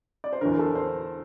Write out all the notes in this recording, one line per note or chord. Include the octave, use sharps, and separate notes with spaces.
D5
C5
E2 D3 A#4
A4
C5